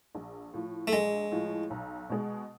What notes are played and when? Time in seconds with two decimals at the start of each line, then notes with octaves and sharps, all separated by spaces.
0.15 A#1
0.53 A2 F3
0.87 A3
0.92 A#1 G#3
1.32 A2 F3
1.70 B1
2.09 B2 G#3